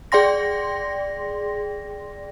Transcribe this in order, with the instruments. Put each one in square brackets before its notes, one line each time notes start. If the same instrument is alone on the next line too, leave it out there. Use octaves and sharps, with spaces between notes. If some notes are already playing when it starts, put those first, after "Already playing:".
[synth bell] G#4 D5 G5 C6 A#6